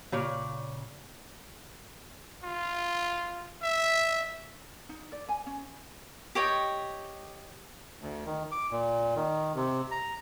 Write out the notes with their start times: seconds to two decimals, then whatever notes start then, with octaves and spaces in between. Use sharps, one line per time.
0.12 A#2 C#3 C#5 D5
2.44 F4
3.63 E5
4.89 D#4
5.12 D5
5.29 G#5
5.46 C#4
6.35 G4 C#5 D#5 G5
8.02 D2
8.26 D#3
8.52 D6
8.71 A#2
9.16 D#3
9.55 C3
9.91 A#5